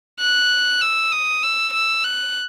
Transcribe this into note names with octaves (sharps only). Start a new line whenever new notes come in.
F#6
E6
D#6
E6
E6
F#6